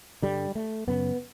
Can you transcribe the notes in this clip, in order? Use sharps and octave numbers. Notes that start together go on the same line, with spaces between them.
G2 D3 G3
A3
F#2 C#3 B3